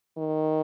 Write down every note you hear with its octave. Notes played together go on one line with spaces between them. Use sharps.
D#3